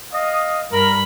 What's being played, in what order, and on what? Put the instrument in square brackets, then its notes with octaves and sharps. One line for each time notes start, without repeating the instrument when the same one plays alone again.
[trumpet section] D#5 F5 D#6
[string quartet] G2 B5 [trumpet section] A#4